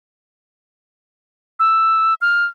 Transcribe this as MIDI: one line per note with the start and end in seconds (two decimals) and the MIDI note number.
1.60 2.14 88
2.21 2.45 89